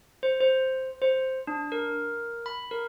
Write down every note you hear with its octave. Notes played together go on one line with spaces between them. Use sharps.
C5
C5
C5
D4
A#4
B5
A#4